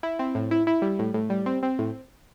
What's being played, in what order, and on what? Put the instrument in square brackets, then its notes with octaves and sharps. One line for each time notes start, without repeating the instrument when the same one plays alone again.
[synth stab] E4
C4
A2
E4
E4
G3
A2
A2
G3
C4
C4
A2